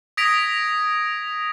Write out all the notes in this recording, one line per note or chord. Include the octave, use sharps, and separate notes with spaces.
D#6 G#6 A#6 B6 D7 F7